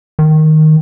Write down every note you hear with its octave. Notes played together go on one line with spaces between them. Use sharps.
D#3